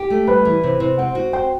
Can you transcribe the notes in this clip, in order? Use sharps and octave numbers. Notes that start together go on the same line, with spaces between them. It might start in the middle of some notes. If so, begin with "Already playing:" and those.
Already playing: G4
A3
G3 B4
E3
C3
C3
C4 F#5
F#4
C5 G5